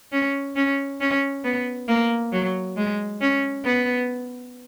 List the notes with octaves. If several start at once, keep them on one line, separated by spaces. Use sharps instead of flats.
C#4
C#4
C#4
B3
A#3
F#3
G#3
C#4
B3